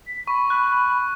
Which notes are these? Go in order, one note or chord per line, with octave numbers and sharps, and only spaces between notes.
B6
B5 C#6
F#6